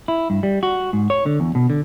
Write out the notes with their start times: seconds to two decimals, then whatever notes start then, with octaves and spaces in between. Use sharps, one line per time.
0.08 E4
0.30 G2
0.43 G3
0.63 F#4
0.93 G#2
1.10 C#5
1.26 D3
1.40 E2
1.55 B2
1.70 D3